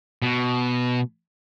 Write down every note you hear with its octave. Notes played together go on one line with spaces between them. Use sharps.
B2